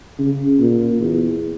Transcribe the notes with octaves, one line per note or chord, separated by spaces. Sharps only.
C#3
A#2
E2